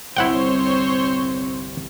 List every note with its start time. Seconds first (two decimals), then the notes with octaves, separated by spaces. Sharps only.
0.17 G1 C2 C4 E4 C5 C#5 F#5 G5